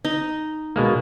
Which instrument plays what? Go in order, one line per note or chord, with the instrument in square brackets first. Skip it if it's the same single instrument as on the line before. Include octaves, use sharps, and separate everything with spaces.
[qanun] D#4
[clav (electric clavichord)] B2 G#3 A#3